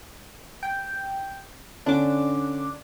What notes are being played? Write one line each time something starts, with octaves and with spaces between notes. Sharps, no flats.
G5
D3 C#4 D4 D6